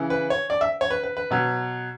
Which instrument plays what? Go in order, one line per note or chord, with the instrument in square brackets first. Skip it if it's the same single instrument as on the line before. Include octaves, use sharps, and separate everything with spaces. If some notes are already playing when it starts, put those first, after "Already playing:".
Already playing: [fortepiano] C#3 E3
B4
C#5
D5
E5
C#5
B4
B4
B4
B2 F#3